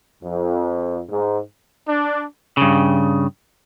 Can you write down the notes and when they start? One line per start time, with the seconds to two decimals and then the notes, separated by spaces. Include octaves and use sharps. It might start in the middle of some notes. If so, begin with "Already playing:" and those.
0.24 F2
1.10 G#2
1.88 D4
2.57 G2 C#3